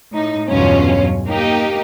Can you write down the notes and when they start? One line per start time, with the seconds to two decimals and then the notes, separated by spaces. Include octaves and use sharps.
0.12 A2 D#4
0.49 E2 G2 B2 F#3 C#4 F4
1.27 A#3 D#4 G4